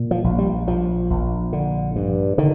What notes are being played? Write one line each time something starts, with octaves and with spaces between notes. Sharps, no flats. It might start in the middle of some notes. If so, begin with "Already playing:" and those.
Already playing: A#2
F3
A#1
G3
A#1 F3
A#1
D3
G2
D3 D#3